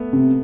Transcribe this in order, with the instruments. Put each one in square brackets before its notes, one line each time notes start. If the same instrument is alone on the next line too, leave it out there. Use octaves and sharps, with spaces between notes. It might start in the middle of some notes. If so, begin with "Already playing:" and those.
Already playing: [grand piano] A3 B3
[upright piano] C3